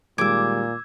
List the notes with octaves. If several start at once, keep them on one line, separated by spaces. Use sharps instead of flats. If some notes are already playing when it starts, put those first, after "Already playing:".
A#2 D#3 G3 G#3 D6 E6 G#6